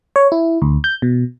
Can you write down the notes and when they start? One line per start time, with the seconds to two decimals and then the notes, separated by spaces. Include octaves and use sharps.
0.16 C#5
0.32 E4
0.62 D2
0.84 G6
1.02 B2